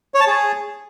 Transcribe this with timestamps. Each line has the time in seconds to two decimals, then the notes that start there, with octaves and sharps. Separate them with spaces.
0.14 C#5
0.20 A5
0.27 G#4